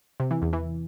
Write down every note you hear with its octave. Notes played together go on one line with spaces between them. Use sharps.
C3
E3
E2
E3